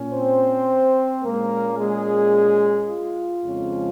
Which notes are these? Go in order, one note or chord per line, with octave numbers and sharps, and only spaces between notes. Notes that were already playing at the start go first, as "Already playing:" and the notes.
Already playing: A#2 C#4
C4 C5
A#2 G#3 A#3 C#4 A#4
G#3 G#4
F4
F2 C#3 F3 G#3 C#4